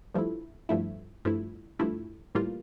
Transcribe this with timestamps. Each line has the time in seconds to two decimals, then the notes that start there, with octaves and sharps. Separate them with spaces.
0.14 G2 F3 A3 E4
0.69 G2 F3 A3 E4
1.25 G2 F3 A3 E4
1.79 G2 F3 A3 E4
2.35 A2 E3 G3 A#3 F4